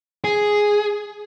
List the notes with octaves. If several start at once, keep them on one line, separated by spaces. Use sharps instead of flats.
G#4